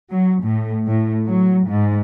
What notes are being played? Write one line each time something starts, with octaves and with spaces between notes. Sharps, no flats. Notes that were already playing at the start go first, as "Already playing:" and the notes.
F#3
A2
A2
F#3
G#2